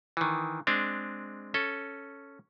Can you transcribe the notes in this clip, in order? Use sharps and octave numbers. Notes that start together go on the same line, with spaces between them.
D#3 E3
G#3 C4 D4
C#4 A4